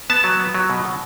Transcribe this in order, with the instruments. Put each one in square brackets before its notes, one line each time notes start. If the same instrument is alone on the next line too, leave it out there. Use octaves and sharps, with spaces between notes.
[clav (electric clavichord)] B3 A5
F#3
B3
F#3
B2
B2